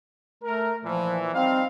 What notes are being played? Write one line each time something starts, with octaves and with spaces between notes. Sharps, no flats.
A3 A#4
A#2 E3 F3
G3 C4 D#4 F5